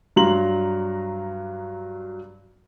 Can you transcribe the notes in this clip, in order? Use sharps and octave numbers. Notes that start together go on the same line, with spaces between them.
G2 F#3 A#5 C6 F#7